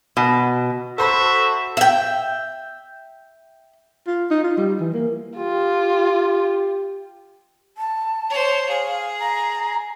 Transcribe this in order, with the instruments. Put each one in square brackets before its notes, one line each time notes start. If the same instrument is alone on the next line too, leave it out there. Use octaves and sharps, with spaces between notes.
[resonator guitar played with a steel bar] B2
[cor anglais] F#4 [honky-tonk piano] A4 C5 B5 [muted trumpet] E5
[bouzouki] E5 G5
[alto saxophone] F4
D#4
F4
G3
E3
A#3
[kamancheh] F4 [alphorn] G4
[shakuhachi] A5
[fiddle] C5 C#5
[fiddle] G#4 [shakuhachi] F5
[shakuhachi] A#5